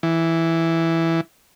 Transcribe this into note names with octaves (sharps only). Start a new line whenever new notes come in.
E3